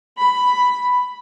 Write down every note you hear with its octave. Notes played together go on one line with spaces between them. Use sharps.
B5